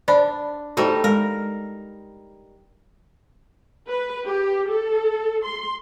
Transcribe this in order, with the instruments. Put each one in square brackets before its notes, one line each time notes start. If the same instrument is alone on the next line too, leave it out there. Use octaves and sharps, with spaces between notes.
[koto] D4 [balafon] C5 D5 B5
[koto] G3 A3 D#4 [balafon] F#4 C5
[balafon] G#3 [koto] A#4
[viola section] B4
G4
A4
C6